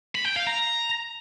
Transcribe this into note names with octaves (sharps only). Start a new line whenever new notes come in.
B5
G5
F5
A#5